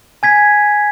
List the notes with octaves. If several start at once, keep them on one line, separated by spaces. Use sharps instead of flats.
G#5 G#6 B6